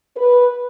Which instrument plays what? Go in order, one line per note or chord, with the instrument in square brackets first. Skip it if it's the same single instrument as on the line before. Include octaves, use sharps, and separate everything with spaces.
[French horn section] B4